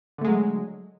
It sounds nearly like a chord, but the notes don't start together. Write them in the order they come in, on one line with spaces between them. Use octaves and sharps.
D3 A3 G#3 F#3